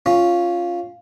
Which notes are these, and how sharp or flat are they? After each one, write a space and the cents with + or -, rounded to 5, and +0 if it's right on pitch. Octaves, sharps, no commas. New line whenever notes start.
C#4 +0 F4 +0